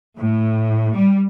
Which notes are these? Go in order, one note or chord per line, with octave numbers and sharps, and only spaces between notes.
A2
G3